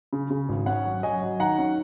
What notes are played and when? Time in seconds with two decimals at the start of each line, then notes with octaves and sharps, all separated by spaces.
0.13 C#3
0.30 C#3
0.49 G#1
0.66 C#4 C#5 F#5
0.85 F#3
1.03 F#3 D#5 G#5
1.22 F#3
1.40 D#3 F#5 A#5
1.59 C#4